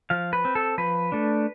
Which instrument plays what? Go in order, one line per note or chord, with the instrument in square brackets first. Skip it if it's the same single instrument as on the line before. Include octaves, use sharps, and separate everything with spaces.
[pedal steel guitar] F3 F5
B4
C4
A4
F3 B4
A3 D4